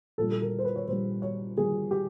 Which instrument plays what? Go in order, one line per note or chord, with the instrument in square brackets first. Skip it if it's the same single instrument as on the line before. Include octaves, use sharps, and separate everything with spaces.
[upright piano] A#1 A#2 G3 A4
A4
A#4
C5
B4
C#5
A#1 A#2 G3 C5
C#5
A#1 A#2 G3 G#4
G4